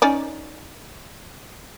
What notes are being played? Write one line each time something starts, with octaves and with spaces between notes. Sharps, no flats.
C#4 D#4 D5